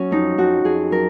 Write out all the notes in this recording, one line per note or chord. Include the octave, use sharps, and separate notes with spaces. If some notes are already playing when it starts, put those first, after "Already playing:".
Already playing: F#3 C#4
F2 D#4
F2 F#4
F2 G#4
F#3 A#4